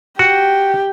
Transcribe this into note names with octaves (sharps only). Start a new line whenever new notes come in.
F#4 G4